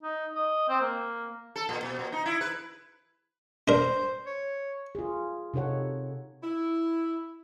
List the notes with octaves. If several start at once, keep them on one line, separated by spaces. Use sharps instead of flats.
D#4
D#5
C4
A#3
A4
A#2
B2
A#2
D#4
E4
B4
D4 A#4 C5
C#5
F4 G#4
C3 D#4 A4 C#5 F#5
E4